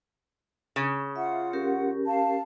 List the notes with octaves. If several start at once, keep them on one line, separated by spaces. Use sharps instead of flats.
C#3
F4 E5 F#5
C#4 G4 A#4
F5 A5